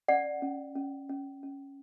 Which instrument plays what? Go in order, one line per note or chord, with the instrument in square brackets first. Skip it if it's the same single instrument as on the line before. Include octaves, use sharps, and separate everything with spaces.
[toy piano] C#4 D5 F#5
C#4
C#4
C#4
C#4